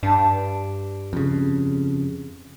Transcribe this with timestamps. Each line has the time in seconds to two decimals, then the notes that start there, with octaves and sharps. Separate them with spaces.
0.03 G2 D4
1.13 F2 C#3